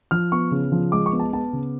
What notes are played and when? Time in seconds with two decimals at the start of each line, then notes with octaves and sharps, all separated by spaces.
0.11 F3 F6
0.32 B3 C#6
0.51 C#3
0.72 F3
0.92 G#3 D6
1.06 C#6
1.12 B3
1.19 A5
1.33 B3 A5
1.53 C#3